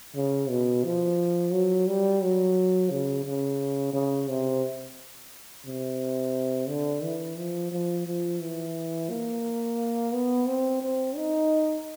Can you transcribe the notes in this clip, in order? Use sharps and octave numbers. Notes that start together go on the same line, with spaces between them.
C#3
B2
F3
F#3
G3
F#3
C#3
C#3
C#3
C3
C3
D3
E3
F3
F3
F3
E3
A#3
B3
C4
C4
D#4